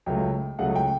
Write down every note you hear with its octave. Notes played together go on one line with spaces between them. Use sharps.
C#2 C#3 F#3 A3 G5
C#2 C#3 F#3 A3 F#5
G5